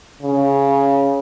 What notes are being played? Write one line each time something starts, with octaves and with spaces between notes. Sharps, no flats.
C#3